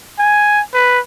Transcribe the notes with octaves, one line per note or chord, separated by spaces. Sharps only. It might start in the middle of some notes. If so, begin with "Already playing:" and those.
G#5
B4